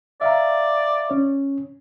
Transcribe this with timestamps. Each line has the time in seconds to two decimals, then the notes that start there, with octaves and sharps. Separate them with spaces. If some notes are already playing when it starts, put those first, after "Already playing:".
0.21 D5 E5 F5 A#5
1.10 C#4 C#5